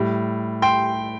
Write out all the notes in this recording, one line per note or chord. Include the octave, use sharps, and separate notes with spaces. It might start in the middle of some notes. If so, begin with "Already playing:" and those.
Already playing: A2 G3
G5 C6